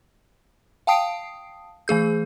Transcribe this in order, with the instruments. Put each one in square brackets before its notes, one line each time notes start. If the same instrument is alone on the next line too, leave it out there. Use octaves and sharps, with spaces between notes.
[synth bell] F5 G5 A5 D#6 C7 D7
E3 A3 G#4 G6